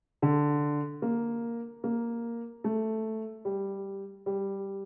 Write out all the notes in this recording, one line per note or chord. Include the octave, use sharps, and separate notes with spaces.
D3
A#3
A#3
A3
G3
G3